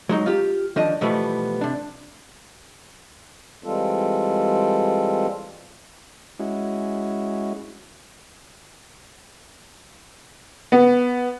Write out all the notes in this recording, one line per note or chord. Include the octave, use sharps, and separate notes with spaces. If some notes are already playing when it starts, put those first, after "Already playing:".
F#3 G#3 D#4
F4 G4
D#3 F3 D4 D#5
B2 E3 F3 G3 A3 B3
C3 D4
E3 G3 G#3 C4 F4 A4
G#3 C#4 E4 F#4
B3